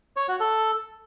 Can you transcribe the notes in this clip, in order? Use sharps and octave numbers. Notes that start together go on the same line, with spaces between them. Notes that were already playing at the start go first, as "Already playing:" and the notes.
C#5
F#4
A4